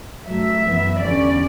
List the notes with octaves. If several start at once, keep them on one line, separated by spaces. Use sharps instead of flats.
G2 F#3 A3 E5
F#2 E3 B3
E2 D3 G3 C#4 D5